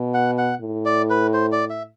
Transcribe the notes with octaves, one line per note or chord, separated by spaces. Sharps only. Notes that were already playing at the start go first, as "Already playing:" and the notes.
Already playing: B2
F#5
F#5
A2
D5
B4
C5
D5
E5